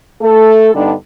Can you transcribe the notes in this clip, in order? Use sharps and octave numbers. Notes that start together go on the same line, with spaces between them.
A3 A4
G2 D3 G3 B3 D4 D#4